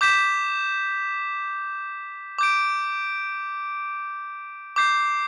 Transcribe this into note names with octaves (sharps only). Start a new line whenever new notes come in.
D6 G6 B6 E7
D6 G6 D7
D6 G6 C7